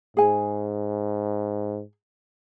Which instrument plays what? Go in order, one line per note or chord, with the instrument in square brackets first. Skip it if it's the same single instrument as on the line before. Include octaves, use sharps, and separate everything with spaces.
[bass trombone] G#2 [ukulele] G#4 G#5